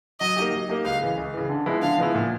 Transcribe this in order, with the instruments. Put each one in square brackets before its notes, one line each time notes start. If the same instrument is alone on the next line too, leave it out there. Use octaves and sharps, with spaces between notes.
[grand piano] F#3 [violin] D#5
[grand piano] A#3 D#4 G4
F#3
A#3 D#4 G4
[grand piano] C#2 [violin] F5
[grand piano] C#3 E3
C#2
C#3 E3
D3
F3 G#3 B3 E4
[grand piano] D3 [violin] F5
[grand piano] F3 G#3 B3 E4
A#2